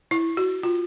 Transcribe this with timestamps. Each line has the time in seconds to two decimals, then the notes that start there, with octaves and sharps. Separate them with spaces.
0.11 E4
0.37 F#4
0.63 F4